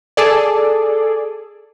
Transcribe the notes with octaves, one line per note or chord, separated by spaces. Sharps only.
G#4 A4 D5